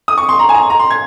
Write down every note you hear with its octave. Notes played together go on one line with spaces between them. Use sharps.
D#6
C#6
C6
A#5
G#5
A#5
A#5
C6
G#6